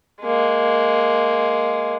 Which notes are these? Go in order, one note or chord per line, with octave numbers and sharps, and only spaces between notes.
G#3 A#3